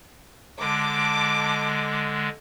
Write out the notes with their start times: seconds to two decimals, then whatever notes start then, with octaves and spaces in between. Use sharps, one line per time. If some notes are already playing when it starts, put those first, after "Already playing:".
0.60 D3 G#3 A5 D6